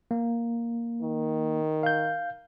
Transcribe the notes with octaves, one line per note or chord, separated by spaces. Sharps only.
A#3
D#3
F5 G6